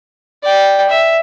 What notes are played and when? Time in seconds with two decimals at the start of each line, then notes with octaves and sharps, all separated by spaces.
0.43 D5 G5
0.89 E5